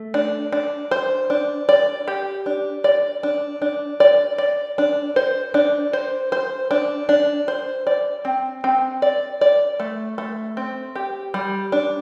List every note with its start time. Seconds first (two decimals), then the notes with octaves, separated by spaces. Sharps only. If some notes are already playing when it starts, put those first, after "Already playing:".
Already playing: A3
0.14 D4
0.52 D4
0.91 C5
1.30 D4
1.69 D5
2.08 G4
2.46 D4
2.84 D5
3.23 D4
3.62 D4
4.00 D5
4.38 D5
4.78 D4
5.16 C5
5.54 D4
5.93 C5
6.32 C5
6.71 D4
7.09 D4
7.48 C5
7.87 D5
8.25 C4
8.64 C4
9.02 D5
9.41 D5
9.80 A3
10.18 A3
10.57 C4
10.96 G4
11.34 G3
11.72 D4